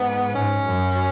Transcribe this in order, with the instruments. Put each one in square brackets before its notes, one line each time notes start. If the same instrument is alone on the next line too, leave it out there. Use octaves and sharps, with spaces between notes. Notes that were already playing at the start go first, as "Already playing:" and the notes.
Already playing: [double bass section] G#2 [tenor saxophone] B3
[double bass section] G#2 [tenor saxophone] C#4
[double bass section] F#2